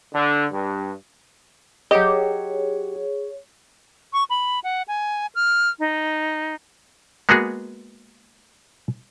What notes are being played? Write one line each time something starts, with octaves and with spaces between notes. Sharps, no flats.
D3
G2
F#3 G4 G#4 C#5 D#5
C#6
B5
F#5
G#5
F6
D#4
G#3 A#3 B3 F#4 G#4